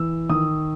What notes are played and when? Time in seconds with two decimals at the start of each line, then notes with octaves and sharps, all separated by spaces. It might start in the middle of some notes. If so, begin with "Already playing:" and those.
Already playing: E3 E6
0.29 D#3 D#6